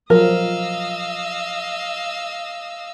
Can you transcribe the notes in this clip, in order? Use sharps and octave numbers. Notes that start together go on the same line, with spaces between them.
F3 F#3 A#4 D#5 F5 E6